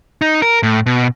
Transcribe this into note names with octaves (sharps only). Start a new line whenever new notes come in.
D#4
A#4
A2
B2